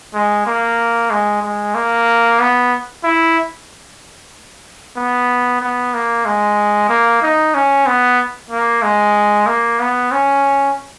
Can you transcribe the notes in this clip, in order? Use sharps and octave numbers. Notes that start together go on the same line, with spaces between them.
G#3
A#3
G#3
G#3
A#3
B3
E4
B3
B3
A#3
G#3
A#3
D#4
C#4
B3
A#3
G#3
A#3
B3
C#4